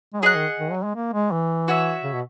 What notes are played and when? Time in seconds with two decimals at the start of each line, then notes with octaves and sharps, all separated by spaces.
0.14 G#3
0.23 F#3 G#4 D#5 F#5
0.35 D#3
0.60 D#3
0.71 F#3
0.83 G#3
0.95 A#3
1.13 G#3
1.32 E3
1.68 F#4 C#5 E5
2.04 C#3
2.13 B2